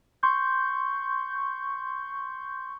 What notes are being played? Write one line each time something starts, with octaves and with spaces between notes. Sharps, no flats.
C6 C#6 G6